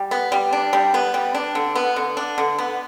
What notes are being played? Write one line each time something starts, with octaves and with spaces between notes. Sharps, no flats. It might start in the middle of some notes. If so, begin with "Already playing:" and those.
Already playing: G3
B3
G3
D4
G3
B3
G3
D4
D3
B3
D3
D4
D3
B3